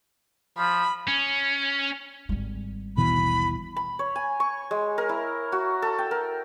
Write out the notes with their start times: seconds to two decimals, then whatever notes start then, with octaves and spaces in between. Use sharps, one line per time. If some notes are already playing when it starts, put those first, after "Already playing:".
0.58 F3 B5
1.08 C#4
2.29 G#1 G3
2.97 D#2 B2 E3 B5
3.76 B5
3.99 C#5
4.16 G#5
4.40 C#6
4.71 G#3
4.98 A#4
5.09 E4
5.52 F#4
5.82 A4
5.98 G5
6.11 A#4